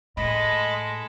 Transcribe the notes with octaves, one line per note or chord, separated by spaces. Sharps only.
A2 G#3 A4 D#5 B5